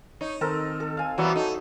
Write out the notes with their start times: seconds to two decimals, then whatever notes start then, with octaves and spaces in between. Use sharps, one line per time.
0.21 D#4 C#5
0.41 D#3 C4 A4 A#4
0.80 A4
0.97 F5 G#5
1.18 E3 F#3 G3 B3 C#5 E5
1.36 D#4 A4